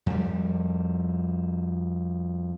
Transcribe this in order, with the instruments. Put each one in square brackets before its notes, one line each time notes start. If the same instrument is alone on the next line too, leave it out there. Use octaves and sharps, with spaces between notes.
[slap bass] F2 G3